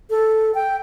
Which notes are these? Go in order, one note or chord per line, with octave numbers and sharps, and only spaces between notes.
A4
G5